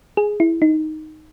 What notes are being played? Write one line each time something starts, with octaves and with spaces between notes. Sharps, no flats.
G#4
E4
D#4